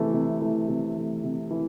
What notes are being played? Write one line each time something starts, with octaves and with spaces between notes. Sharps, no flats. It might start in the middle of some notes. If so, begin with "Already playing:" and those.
Already playing: C3 E3 A3
C3
E3 A3
C3
E3 A3
C3
E3